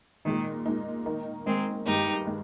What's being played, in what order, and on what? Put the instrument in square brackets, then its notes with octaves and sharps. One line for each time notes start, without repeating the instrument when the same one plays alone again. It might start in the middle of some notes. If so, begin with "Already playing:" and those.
[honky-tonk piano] A#2 G#3 D#4 [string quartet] D#3
[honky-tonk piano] A#2 G#3 D#4
D#3 A#3 D#4
[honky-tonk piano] D#3 A#3 D#4 [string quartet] G#3 C4
[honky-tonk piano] G2 D#3 G#3 [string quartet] D#4 G4
[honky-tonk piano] D#3 G#3